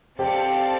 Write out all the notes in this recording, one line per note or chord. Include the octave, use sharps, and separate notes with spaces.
C4 G4 A4 C5 D5 F5 A5